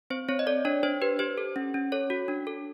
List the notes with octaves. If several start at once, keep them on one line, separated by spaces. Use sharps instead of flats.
C4 C5
C4 C#5
D#5
A4 D5
D4 C#5
D4 C5
G4 B4
G4 C5
A4
C#4
C#4
A4 C#5
F#4
D4
A4